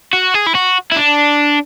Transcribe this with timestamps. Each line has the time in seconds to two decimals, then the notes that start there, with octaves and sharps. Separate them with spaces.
0.13 F#4
0.34 G#4
0.46 E4
0.55 F#4
0.92 E4
0.96 D4